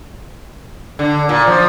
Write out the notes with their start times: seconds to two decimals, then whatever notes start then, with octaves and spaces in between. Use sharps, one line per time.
0.99 D3
1.29 A#2
1.47 F3